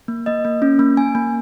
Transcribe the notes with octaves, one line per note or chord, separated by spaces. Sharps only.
A#3
A#3 D#5
A#3
C#4
A#3
A#3 G#5
A#3